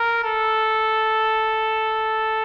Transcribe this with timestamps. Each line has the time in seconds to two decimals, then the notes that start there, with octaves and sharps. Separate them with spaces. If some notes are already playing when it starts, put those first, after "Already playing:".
Already playing: A#4
0.23 A4